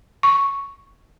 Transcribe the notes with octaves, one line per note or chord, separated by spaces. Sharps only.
C#6